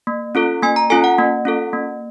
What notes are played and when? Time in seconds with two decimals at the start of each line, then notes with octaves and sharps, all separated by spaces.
0.07 A#3
0.35 C#4 F4 A4
0.62 A#3 G#5
0.76 A#5
0.90 C#4 F4 A4 G#5
1.04 F#5
1.18 A#3
1.45 C#4 F4 A4
1.73 A#3